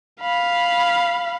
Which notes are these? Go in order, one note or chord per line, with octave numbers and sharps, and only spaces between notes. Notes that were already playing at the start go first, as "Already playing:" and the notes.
F5 B5